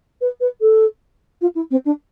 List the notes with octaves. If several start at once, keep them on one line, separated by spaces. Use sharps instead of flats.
B4
B4
A4
F4
E4
C4
D4